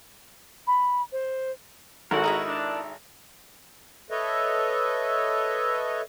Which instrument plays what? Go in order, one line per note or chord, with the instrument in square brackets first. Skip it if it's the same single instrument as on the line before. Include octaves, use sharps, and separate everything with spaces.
[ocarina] B5
C5
[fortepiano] G#1 A4 [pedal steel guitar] E4 A#4 [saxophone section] F#4 [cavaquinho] F#5
[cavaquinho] D#4 G#4 E5
[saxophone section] D4
[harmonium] A4 B4 C#5 D#5 E5